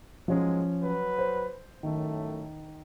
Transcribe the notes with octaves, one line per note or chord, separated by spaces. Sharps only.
G#2 F3 F#3 G#3 C#4
F#3 B4
C5
F#2 A2 D#3 A3